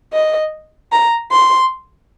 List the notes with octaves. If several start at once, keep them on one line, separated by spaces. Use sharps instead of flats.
D#5
A#5
C6